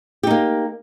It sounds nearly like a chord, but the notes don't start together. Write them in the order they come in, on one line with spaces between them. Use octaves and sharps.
G4 D#4 A#3